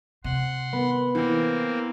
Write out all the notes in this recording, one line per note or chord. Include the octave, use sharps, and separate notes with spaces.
C3 F#5 C6
B3
E3 A#3 C4